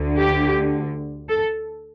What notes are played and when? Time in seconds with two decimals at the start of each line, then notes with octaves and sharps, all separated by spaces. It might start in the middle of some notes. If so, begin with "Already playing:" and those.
Already playing: D2 D3
0.19 G4
1.29 A4